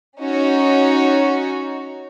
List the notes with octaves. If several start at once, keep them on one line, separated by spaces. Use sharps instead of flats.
C#4 D#4 F#4 C#5